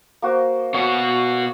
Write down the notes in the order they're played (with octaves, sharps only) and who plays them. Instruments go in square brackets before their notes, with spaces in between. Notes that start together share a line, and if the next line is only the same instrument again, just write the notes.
[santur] A#3 F#4 C5
[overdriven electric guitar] B2 F#4 [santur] C#5